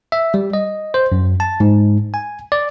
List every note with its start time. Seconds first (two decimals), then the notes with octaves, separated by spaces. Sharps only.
0.12 E5
0.34 G3
0.53 D#5
0.94 C5
1.12 F#2
1.40 A5
1.60 G#2
2.14 G#5
2.52 D5